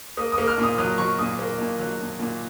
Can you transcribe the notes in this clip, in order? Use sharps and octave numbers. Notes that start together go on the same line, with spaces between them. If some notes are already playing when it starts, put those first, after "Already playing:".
A#3 D#6
D#6
A#3
F6
A#2
D#6
F#3 D#6
F#3 C#6
A#2 D#6
A#3
A#2
F#3
A#2
A#2